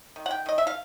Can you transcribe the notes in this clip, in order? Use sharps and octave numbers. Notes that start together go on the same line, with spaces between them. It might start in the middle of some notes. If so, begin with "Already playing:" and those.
D#3
F#5
G5
D#3 D#5
E5
F5